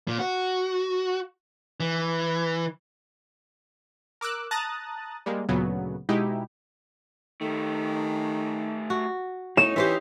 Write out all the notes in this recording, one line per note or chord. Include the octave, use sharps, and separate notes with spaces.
A#2
F#4
E3
A#4 D6 E6 F#6
A5 A#5 D#6 F#6 A6
G3 G#3 A#3
D2 A#2 C#3 F#3 B3
B2 G#3 D#4 E4 G4
D#3 A3 G4
F#4
A2 C#4 D#4 E7
E3 G4 C5 E5